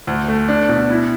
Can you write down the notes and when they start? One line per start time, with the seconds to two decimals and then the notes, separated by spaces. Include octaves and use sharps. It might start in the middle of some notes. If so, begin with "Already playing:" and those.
0.07 D2
0.28 A3
0.48 D4
0.69 B2
0.90 E4